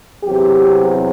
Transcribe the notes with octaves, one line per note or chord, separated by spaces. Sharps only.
E2 C3 F#3 C4 G4